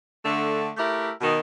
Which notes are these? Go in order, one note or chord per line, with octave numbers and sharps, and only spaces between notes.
D3 A3
A3 E4 G4 A#4
B2 D#3